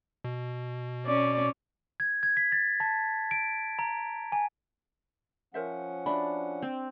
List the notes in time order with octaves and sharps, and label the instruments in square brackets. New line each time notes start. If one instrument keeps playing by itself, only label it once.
[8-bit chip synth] B2
[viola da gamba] C#4 [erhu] D5
[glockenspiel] G#6
G#6
B6
A6
A5
D7
A#5
G#5
[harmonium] F3 C#4 F#5 [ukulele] A#4 C5 E5
[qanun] D4 [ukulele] F#4 E5 B5
[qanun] C4